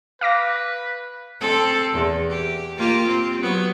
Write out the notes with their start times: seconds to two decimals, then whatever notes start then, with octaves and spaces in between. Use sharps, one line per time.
0.21 B4 F5 D6 A#6
1.40 C4 A4
1.94 E2
2.30 G4
2.78 A#3 F4 G4
3.07 C4
3.42 F#3 B3